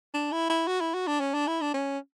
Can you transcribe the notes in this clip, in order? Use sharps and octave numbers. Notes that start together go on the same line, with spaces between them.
D4
E4
E4
F#4
E4
F#4
D4
C#4
D4
E4
D4
C#4